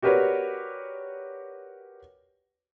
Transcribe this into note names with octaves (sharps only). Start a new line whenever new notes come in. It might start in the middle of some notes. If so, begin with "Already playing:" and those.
F#4 G4 A#4 B4 C#5 D5